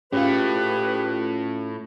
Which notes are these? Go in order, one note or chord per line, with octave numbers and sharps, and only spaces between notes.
A2 A3 C#4 F4 G4 G#4 B4